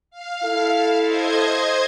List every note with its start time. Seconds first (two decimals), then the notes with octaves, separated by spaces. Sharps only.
0.11 F5
0.43 E4 A4
1.03 C5 D#5 G#6